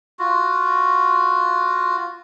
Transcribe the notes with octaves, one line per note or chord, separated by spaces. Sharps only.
F4 F#4